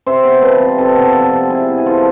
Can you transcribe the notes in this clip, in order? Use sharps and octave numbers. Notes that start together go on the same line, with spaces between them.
C3 C5 E5
B3
F3 B4 D5
C3
C3 F4 A4
B3
F3
C3
C3 E4 G#4
B3
G#4
F3 F4 A4